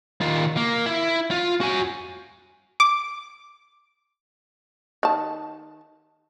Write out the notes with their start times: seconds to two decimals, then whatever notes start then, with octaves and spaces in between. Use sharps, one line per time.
0.21 D#3 F4
0.57 A#3
0.86 E4
1.31 F4
1.61 F#4 G#5
2.80 D6
5.03 D#3 A5